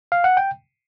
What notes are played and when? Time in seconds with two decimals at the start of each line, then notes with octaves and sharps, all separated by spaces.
0.12 F5
0.24 F#5
0.37 G5